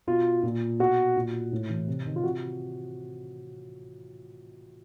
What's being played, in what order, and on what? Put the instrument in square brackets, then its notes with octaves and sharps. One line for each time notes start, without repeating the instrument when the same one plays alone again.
[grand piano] B2 F4
A#2
B2 F#4
A#2
A2
E3
C3
D#3
F4
C3 F#4